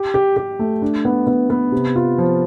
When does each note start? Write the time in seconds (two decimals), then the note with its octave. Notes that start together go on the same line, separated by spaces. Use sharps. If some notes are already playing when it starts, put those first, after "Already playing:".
Already playing: G4
0.14 G4
0.36 G4
0.59 A3
0.82 D4
1.05 B3
1.27 B3
1.50 B3
1.72 C3
1.95 F4
2.18 F3